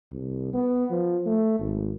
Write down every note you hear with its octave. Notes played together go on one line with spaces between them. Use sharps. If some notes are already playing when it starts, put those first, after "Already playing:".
C2
B3
F3
A3
G#1